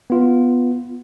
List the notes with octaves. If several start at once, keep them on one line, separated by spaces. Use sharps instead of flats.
B3 F4